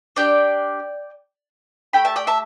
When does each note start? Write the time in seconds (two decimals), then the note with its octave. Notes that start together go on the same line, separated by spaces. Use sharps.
0.16 D4 G4 D5 G5
1.93 A3 G4 G5 B5
2.05 E5 A5
2.16 D5 G5
2.27 E5 A5